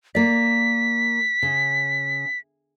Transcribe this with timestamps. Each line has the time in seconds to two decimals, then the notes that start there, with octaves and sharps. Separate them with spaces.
0.15 A#3 D5 B6
1.43 C#3